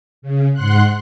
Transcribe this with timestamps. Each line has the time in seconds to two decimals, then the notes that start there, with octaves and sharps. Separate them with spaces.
0.22 C#3
0.53 G#2 F#5 C6 F#6